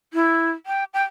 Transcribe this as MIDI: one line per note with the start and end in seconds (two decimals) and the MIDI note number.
0.13 0.50 64
0.66 0.84 79
0.94 1.03 79